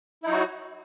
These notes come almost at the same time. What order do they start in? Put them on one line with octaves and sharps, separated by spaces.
E4 D#4 F#3 F#4